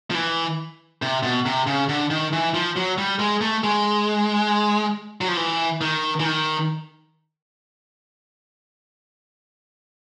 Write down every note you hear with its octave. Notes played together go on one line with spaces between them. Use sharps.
F3
E3
C3
B2
C3
C#3
D3
D#3
E3
F3
F#3
G3
G#3
A3
G#3
F#3
F3
E3
D#3
E3
D#3